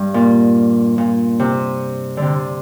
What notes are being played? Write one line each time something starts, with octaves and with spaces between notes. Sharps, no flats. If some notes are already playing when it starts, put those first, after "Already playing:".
Already playing: G2
A#2
A#2
C3
D3
C3